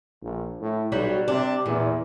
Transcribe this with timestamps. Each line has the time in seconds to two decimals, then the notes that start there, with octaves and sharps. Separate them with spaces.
0.22 A#1
0.61 A2
0.92 B1 F#3 G3 F#4
1.28 C3 D4
1.66 E2 A#2